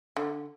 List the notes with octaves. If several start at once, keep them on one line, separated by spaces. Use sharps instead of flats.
D3